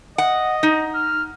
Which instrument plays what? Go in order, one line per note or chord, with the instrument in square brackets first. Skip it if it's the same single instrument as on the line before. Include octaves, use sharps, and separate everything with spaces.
[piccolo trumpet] D#5 [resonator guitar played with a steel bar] F#5
[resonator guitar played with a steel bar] D#4
[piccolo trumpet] F6